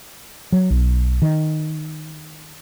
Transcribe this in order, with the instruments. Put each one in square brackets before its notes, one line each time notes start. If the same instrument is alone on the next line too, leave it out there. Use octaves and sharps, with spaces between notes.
[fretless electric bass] F#3
B1
D#3